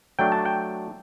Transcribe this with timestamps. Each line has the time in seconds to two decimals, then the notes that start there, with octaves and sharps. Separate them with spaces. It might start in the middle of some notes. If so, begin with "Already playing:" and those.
0.19 F#3 A3 D4 G5
0.32 A5
0.45 G5